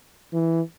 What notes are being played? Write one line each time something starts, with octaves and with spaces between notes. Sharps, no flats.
E3